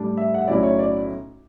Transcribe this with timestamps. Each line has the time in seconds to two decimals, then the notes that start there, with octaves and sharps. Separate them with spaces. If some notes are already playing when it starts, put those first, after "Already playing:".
Already playing: A2 G3 D4
0.17 E5
0.34 F#5
0.41 E5
0.48 B1 A2 F#3 C#4 E4 D5
0.63 C#5
0.79 D5